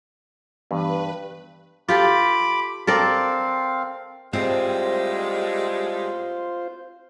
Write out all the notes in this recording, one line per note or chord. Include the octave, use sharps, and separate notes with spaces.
G2 E3 B3 B4
F4 G4 A4 B5 D6
C4 A4 A#4 D5 F5
A2 G3 G#3 C4 F4 C5